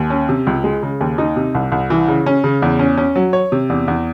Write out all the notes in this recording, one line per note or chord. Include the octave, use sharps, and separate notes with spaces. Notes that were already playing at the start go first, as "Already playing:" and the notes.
Already playing: D#2
C#4
C3
C#2
G#3
C#3
D#2
D#4
C3
C2
C2
E3
C#3
C#4
C#3
E2
C#4
C#4
F#3
C#5
C3
E2
E2